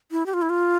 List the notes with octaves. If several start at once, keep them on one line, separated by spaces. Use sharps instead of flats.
E4
G4
F4
E4
F4